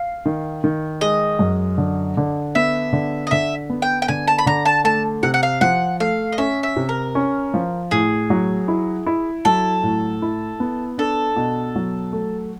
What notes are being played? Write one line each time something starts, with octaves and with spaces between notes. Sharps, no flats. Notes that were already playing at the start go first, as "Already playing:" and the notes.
Already playing: F5
D#3
D#3
G#3 D#5
F#2
D3
D3
B3 E5
D3
D#5
D3 E5
B3
G5
G5
D3 G#5
A5
B5
D3 A#5
A5
A3 A5
C3 F#5
F#5
F5
F3 F#5
A3 F5
D#5
C#4 E5
E5
C3
A#4
C#4
F3
A2 G#4
F#3
E4
E4
F#3 A4
A2
E4
B3
D4 A4
B2
F#3
A3